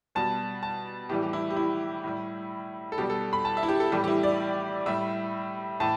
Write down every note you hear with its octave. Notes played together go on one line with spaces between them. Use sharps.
B2 G3 A5
A5
A2 E3 G3 G4
G4
E4
G4
E4
A2 G3
A4
B2 G3 G4
A4
B5
A5
E5
E4
G4
A4
A2 E3 G3 G4
G4
E4
D5
A2 G3 E5
A2 E3 A5